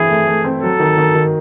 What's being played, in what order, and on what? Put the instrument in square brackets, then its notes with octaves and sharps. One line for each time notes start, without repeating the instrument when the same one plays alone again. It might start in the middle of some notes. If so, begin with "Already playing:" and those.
Already playing: [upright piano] E3 C4 E4 [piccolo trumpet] G#4
[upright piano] A3
A3
C4
[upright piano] F#3 [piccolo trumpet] A4
[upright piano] D#3
D#3
D#3